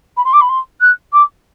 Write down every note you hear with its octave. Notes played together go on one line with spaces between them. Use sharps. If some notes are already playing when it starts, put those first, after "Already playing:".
B5
C6
D6
B5
C6
F#6
D6